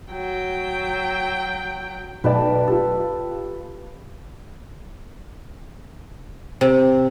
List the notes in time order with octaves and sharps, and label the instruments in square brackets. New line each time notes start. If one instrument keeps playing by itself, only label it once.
[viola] F#3 G5
[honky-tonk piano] B1 D5 [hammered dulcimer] B4 G5 A5
[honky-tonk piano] F4 G4 [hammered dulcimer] A4
[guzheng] C3